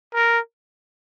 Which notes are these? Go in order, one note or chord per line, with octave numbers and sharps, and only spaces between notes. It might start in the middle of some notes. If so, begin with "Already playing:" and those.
A#4